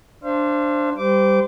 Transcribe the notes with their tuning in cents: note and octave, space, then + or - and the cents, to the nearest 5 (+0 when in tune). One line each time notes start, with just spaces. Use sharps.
D4 +0 C5 +5 F5 -40
G3 +0 C5 -30 D6 -15